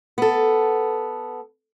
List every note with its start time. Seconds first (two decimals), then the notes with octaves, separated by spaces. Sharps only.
0.18 B3 A4